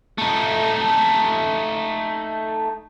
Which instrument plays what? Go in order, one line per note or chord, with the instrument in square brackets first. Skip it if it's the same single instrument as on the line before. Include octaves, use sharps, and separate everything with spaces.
[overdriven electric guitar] A3 D#4